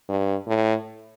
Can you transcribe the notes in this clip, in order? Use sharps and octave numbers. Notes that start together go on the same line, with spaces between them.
G2
A2